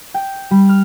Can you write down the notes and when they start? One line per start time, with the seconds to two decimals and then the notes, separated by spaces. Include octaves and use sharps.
0.14 G5
0.51 G3
0.69 F6